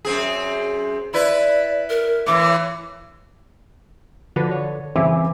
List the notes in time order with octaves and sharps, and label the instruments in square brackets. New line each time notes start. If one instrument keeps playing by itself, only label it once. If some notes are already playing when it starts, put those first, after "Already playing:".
[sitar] F#2 C4 G#4
[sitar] E4 B4 [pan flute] D5
[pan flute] A#4
[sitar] A2 E3 [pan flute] D6
[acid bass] D3 [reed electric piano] F3 F#4 B4
[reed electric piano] C#5
[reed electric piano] C#3 C4 [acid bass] E3 [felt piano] E5 G#5 D6